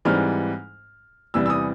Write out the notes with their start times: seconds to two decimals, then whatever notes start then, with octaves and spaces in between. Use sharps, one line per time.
0.05 G#2 E3 G3 C4 F6
1.34 E2 C3 E3 G3 E6
1.46 E6
1.50 D#6